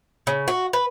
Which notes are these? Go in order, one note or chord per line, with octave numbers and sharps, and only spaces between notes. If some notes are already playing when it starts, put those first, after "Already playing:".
C#3
F#4
B4